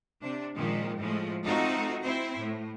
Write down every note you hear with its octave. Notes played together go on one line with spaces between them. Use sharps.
C3 D4
A#2 D#3 F3 G#3
A2 F3 G#3 A3
A3 C4 D#4 F4 F#4 A4
C4 E4 C5
A2